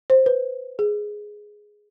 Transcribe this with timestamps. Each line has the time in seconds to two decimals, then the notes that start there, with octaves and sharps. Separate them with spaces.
0.10 C5
0.26 B4
0.79 G#4